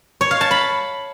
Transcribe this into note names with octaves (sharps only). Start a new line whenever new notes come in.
C#5
F5
A5
B5